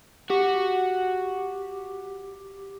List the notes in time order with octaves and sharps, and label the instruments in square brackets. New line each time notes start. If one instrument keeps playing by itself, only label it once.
[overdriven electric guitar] F#4 [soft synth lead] G4